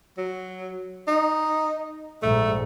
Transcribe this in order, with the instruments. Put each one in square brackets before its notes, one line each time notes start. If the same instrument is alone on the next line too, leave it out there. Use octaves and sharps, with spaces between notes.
[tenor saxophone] F#3
D#4
[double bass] A#1 G#2 [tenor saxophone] A3